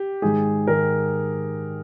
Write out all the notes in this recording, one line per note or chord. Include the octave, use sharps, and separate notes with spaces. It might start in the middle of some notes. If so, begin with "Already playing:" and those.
Already playing: G4
G#2 D#3 G#3 G#4
G#2 D#3 G#3 A#4